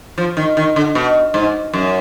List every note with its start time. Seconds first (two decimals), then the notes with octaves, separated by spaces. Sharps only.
0.18 F3
0.37 D#3
0.57 D#3
0.76 D3
0.95 B2
1.34 G#2
1.74 F#2